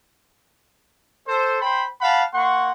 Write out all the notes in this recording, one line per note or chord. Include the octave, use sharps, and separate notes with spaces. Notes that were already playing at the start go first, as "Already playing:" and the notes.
A4 C5
C5 G5 B5
F5 F#5 A5 B5
A#3 F#5 C6 C#6